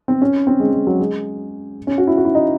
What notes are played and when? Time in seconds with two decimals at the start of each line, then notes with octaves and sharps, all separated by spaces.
0.08 C4
0.22 C#4
0.47 C4
0.60 G#3
0.73 G#3
0.87 F#3
1.00 G#3
1.87 C#4
1.98 F#4
2.07 E4
2.17 F#4
2.25 E4
2.35 D#4